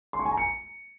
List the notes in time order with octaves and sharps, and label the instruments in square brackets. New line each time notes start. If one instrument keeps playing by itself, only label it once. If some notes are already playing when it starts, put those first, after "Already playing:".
[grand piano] C6
C#6
G#5
A#5
C#7